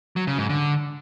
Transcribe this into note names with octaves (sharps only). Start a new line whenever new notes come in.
F#3
C#3
G#2
D3